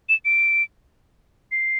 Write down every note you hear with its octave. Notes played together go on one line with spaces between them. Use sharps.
E7
D7
C7